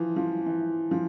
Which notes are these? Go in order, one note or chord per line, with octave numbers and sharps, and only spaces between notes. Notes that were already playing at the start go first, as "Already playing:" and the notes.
Already playing: E3 F3
F3
E3
F3